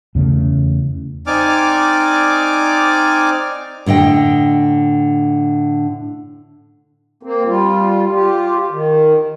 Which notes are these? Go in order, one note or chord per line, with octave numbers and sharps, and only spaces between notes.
E2 C#3 A3
C4 D#4 D5 G#5 D6 F6
A2 D3 D#5 G5
A#3 C4
G3 F4
F4 G4
D#3